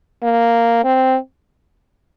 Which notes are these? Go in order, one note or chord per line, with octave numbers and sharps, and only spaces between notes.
A#3
C4